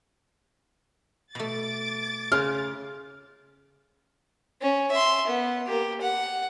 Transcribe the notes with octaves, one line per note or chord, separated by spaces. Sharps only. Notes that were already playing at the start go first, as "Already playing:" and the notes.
B2 A3 D6 A6
C#3 C6 F6
C#4
E5 C6
B3
A#3 G4
F#5